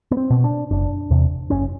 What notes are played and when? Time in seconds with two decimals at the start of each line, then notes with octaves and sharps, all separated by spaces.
0.11 B3
0.17 C4
0.30 B2
0.44 D4
0.71 F#1 D4
1.10 E2 C3
1.50 F#1 C#4